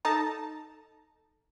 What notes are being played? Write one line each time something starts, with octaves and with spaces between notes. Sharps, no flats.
D#4 A4 A5 A#5